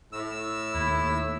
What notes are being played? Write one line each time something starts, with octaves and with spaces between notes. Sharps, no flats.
A2 E6
D#2 E4